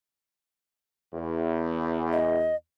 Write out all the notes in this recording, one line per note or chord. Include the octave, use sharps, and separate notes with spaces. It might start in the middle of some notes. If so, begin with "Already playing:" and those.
E2
D#5